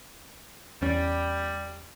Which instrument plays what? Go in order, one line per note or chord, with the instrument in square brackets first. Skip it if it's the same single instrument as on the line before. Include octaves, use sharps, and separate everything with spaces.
[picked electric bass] E2 C#4 [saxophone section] G3